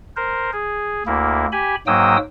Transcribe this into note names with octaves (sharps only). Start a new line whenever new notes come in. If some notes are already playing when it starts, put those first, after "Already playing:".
A#4 C5
G#4
D2 A#3 E4
G4 G#5 B5
G#2 F#3 A#3 G5 D#6 E6